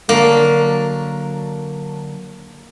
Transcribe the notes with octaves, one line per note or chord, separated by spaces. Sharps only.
D3 F#3 A#3 D4